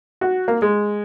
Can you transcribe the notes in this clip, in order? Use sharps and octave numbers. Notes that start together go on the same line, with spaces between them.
F#4
A#3
G#3